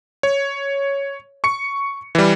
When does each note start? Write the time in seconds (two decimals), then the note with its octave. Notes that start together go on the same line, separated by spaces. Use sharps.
0.23 C#5
1.44 C#6 C#7
2.15 E3 G3